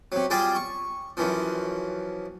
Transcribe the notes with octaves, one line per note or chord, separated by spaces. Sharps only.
C3 F#3
G3 F4 G#4 D5 G5 C6
C#6
F#2 E3 F3